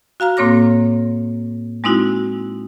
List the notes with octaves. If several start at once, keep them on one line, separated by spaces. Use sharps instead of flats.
F#4 F5 A#5 F6
A2 A#3 C4 C#5 D6 A#6
G#3 C4 D#4 E4 F#4